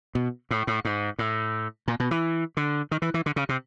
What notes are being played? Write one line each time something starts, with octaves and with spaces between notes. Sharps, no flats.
B2
A2
A2
G#2
A2
A#2
B2
E3
D3
D#3
E3
E3
D3
C#3
C3